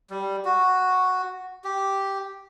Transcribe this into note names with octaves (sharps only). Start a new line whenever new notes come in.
G3
F#4
G4